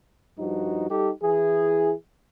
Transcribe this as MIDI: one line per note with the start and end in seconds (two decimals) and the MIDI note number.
0.38 0.88 43
0.38 0.88 53
0.38 0.88 63
0.38 0.88 66
0.89 1.10 55
0.89 1.10 63
0.89 1.10 67
0.89 1.10 69
1.21 1.93 52
1.21 1.93 64
1.21 1.93 68